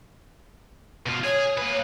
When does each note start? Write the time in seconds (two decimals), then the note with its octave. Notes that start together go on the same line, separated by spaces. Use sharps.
1.06 B2 F4
1.24 G#4 C#5
1.58 A#3 B4